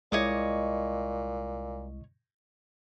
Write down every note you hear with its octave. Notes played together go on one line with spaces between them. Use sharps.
C2 A#2 G#3 E4 C#5 D#5 D6